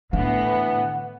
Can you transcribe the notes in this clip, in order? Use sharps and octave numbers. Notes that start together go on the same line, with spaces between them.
A2 D3 E3 B3 F#5